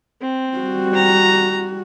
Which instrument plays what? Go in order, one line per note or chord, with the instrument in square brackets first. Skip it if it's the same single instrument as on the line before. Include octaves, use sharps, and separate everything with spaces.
[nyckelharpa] C4
[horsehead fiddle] G3 F#4
[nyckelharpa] A#5